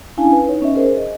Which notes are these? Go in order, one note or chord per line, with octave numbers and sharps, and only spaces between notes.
C#4 D4 E4 F5 G#5 A5
B4
D#4 C#5
B3 C#4 D#5 E5
G#4 A#4 C5
D#5